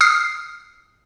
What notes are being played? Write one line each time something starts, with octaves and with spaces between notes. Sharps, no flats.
D#6 F6 C7